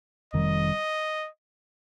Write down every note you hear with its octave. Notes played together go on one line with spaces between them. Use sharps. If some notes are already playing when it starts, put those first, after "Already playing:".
F1 F2 D#3 G3 D#5